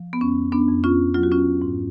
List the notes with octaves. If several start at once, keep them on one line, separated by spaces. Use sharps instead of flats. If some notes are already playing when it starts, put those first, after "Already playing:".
Already playing: F3
B3
F2 C#4
B3 D4
F2
C#4 F4
F#3 F4
F#4
C#4 F4
G#2